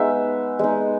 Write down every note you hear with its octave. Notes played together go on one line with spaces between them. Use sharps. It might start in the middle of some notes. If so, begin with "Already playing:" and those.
Already playing: G#3 B3 D#4 E5
G#3 B3 D#4